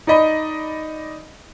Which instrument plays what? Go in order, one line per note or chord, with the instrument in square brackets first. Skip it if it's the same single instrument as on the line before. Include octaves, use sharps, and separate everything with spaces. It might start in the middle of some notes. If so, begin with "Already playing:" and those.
[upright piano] D#4 D5 D#5 B5